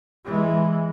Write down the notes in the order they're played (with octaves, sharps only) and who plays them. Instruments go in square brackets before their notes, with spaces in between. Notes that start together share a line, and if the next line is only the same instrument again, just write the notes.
[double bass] E3 G#3